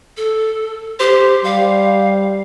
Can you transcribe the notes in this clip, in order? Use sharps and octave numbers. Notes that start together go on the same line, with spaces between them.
A4
G4 C5
G3 F5